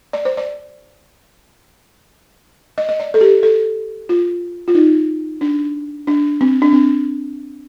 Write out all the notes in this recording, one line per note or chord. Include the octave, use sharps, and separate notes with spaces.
D5
C5
D5
D#5
D#5
D5
A4
G4
A4
F4
F4
D#4
D4
D4
C4
D4
C4